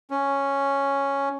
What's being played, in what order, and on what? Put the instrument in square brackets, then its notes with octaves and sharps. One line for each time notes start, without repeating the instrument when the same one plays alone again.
[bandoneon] C#4